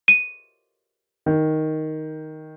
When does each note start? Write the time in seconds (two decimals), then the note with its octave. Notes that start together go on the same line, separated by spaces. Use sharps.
0.08 D#7
1.26 D#3